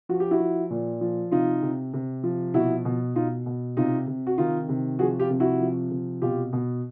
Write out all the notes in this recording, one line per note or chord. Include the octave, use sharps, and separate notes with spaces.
F3 F#4
G4
E4 F#4
F3
A#2
F3
C3 D#4 F4
C3
C3
F3
B2 E4 F#4
B2
B2 D#4 F4
B2
C3 D#4 F4
C3
F#4
D#3 D#4 F4
C3
F3 F#4 G#4
F4 G4
C3
E4 F#4
F3
C3
B2 F4 G4
B2